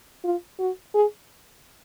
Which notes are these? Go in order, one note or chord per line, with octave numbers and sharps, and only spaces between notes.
F4
F#4
G#4